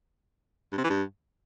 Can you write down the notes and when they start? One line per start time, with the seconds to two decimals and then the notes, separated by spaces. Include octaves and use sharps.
0.72 G2
0.78 C3
0.84 E3
0.90 G2